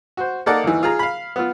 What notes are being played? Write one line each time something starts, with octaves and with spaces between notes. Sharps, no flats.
F#4 C5
A#3 D#4 A4 A#4 D5 F#5
D#2 E3
F4 G#4 A#5
F5 B5
B3 F4